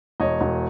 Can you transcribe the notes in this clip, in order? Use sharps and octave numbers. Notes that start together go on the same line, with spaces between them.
E1 C#5 D#5
E1